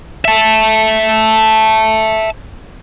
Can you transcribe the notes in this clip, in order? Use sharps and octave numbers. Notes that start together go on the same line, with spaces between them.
E5 A5